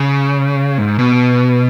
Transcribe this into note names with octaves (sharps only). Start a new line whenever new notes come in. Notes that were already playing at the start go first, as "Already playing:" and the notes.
Already playing: C#3
G#2
B2